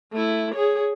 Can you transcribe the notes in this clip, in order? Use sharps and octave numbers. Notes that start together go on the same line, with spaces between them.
A3 E4
G#4 C#5